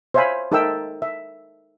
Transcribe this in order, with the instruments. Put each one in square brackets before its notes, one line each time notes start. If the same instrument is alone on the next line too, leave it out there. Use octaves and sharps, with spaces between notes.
[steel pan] C5 C#5 E5 F5 G#5 B5
D#4 A4 A#4 E5 G5 E6
E5